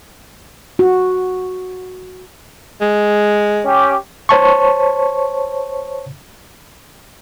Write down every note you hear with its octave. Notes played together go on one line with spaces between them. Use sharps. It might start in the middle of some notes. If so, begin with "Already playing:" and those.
F#4
G#3
C#4 G4
C5 C#5 A5 C#6